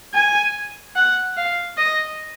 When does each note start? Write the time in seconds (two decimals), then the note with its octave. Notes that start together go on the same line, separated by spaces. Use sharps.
0.14 G#5
0.96 F#5
1.37 F5
1.77 D#5